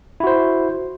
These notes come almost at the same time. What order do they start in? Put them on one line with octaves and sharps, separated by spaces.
E4 F#4 C5